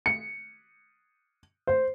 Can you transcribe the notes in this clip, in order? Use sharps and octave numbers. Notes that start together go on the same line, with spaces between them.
C#7
C5